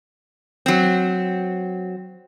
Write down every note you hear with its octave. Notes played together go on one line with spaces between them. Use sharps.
F#3 C4